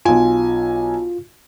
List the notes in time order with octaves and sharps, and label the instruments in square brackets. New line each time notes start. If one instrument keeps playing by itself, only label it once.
[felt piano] B1 G#5 [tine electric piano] F4